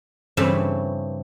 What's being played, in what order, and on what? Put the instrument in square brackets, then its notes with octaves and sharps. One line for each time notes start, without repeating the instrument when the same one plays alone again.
[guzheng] G2 C#3 E3 A3 C4